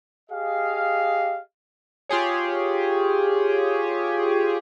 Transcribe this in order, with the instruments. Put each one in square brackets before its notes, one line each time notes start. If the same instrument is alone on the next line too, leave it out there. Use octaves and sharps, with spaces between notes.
[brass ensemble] G4 G#4 D#5 F5
[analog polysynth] F4 G4 G#4 C#5